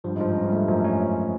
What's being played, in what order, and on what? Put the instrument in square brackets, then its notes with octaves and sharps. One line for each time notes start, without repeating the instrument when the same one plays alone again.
[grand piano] G2 [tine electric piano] F3
[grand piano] G#2 [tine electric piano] F3
[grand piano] G2
[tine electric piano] C#4
[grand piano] G2
[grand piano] G#2 [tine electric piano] A3
[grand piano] F#2 [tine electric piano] F3
[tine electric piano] C#4